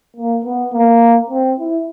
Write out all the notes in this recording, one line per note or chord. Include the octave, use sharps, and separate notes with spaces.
A#3
B3
A#3
C4
E4